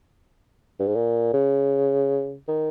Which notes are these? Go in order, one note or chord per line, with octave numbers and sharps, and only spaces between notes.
G2
G#2
A#2
C#3
D#3